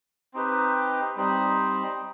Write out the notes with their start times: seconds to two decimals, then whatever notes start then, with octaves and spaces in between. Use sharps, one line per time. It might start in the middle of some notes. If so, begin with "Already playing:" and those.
0.34 C4 D#4 G4 B4
1.16 G3 C4 D#4